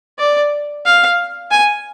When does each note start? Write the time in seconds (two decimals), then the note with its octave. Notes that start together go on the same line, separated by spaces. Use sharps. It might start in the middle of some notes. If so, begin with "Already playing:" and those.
0.19 D5
0.85 F5
1.51 G#5